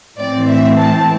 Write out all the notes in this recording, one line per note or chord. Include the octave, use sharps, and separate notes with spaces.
A2 E3 C4 D5
E5
A5